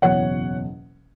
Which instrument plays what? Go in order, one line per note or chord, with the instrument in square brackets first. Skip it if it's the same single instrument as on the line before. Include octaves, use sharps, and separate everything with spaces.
[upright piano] F#1 E2 B2 C#5 F#5